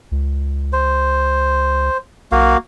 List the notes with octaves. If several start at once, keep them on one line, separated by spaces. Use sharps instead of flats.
C#2
C5
B1 A#3 F#4 F5